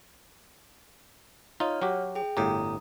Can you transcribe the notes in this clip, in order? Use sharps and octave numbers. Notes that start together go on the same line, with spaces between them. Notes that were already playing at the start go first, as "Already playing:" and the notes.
D#4 F4 C#5 F6
F#3 F#4 G4
G#4 G5
G1 A2 G4 A#5 D#6